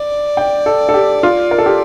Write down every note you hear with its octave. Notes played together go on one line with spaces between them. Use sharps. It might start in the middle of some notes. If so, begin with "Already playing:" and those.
Already playing: D5
G5
A4
A4
G4
F4
A#4
A4
G4